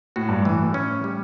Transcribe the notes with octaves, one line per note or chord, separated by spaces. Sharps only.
A2 F#4
G2
A2 E3
C#4
G3